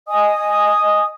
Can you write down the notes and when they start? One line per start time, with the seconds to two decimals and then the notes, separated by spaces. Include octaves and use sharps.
0.08 D#5 G#5 D#6